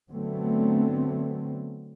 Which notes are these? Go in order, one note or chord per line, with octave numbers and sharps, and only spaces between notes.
D3 F#3 A3 B3 C4